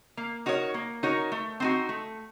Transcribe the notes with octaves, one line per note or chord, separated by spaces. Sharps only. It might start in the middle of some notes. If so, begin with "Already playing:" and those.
A#3
D#4 F#4 A#4 C#5
A#3
D#4 F#4 A#4 C#5
A3
C4 D#4 F#4
A3